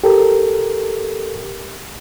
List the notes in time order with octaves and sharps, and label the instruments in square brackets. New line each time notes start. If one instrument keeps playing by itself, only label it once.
[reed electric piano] G4 A4 A#4